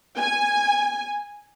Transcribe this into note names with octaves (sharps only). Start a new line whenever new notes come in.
G#5